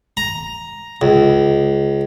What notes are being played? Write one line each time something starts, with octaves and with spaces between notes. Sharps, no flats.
A#5
C#2